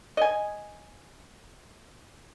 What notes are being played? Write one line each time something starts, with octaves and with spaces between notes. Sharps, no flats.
D#5 G#5